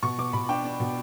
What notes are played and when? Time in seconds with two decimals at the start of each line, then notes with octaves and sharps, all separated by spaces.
0.03 B2 C#6
0.18 B2 D6
0.33 B2 B5
0.49 D4 G5
0.65 D4
0.80 B2